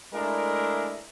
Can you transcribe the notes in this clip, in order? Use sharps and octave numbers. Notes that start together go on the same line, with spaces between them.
G#3 A3 D4 E4 A#4